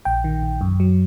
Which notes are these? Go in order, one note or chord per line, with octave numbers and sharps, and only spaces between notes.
A#1 G5
D#3
A#1
F#2
F#3